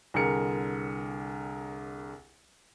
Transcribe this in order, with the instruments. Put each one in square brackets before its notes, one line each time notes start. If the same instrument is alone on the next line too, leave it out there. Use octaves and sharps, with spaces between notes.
[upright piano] C2 D3 G#4 A#4 C#7